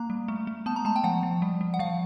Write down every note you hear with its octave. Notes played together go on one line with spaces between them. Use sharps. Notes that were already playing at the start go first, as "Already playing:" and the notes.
Already playing: A#3 A#5
G3
A3
A3
B3 A5
A#5
G#3 A5
G5
F3 F#5
F3
G3
G3
F#5
F3 F5